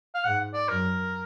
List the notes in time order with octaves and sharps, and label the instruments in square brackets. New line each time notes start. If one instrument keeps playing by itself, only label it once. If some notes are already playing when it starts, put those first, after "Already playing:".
[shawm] F5
[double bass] G#2 [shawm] F#5
[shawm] D5
[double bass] F#2 [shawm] A#4